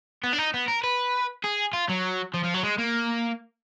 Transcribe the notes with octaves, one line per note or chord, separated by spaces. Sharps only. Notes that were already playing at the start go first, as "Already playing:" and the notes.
B3
D4
D#4
B3
A#4
B4
G#4
F4
F#3
F3
F3
F#3
G#3
A#3